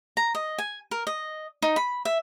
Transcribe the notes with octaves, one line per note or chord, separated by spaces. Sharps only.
A#5
D#5
G#5
A#4
D#5
D#4
B5
E5